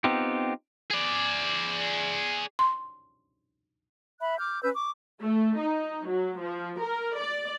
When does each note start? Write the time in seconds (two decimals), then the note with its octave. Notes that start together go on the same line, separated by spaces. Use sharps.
0.04 B3 C4 D#4 F4 G4
0.91 G#4 D5
2.59 C6
4.20 E5 B5 F#6
4.39 D6 F6 G6
4.62 C#4 B4 E6 G6
4.74 C#6 D6
5.21 A3
5.58 D#4
6.07 F#3
6.41 F3
6.81 A#4
7.18 D5